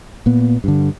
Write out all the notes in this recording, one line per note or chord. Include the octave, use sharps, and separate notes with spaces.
A#2 B3
G2 D3